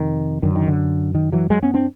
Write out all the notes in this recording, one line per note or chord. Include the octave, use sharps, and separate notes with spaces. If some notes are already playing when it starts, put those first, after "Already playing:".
Already playing: F2 C3 D#3
F#2 D3 D#3
D#3
D3
D#3
E3 F#3
F#3 G#3
B3 C#4
C4 D4